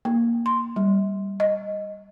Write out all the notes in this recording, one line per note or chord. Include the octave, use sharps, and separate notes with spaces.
A#3
C6
G3
D#5